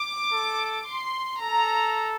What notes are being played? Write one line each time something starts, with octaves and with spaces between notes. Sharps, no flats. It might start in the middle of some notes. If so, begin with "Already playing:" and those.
Already playing: D6
A4
C6
A4 A#5